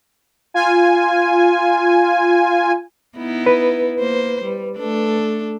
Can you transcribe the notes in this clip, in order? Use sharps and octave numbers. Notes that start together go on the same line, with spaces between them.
F4 G#5
B3 D#4 E4
B4
A#3 C5
G3
A3 D4 A4